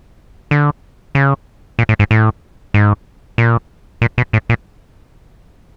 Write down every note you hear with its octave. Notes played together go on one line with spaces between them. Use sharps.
D3
C#3
A#2
A2
G#2
A2
G#2
A#2
A#2
B2
A2
A#2